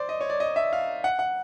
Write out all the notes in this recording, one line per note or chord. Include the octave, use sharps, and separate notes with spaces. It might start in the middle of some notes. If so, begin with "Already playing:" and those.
Already playing: C5 D5
D#5
C#5
D5
D#5
E5
F5
F#5
F#5